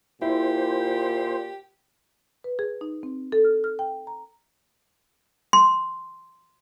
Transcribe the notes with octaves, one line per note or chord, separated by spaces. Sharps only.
A#2 E4 G4 C5
B4
G#4
D#4
C4
A4
F6
F6
G5
A#5
C6